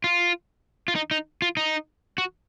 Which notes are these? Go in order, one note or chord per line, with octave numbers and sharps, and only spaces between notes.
F4
F4
D#4
D#4
F4
D#4
F#4